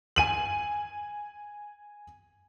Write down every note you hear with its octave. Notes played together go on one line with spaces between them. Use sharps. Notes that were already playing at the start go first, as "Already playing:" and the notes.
G#5 D#7 F#7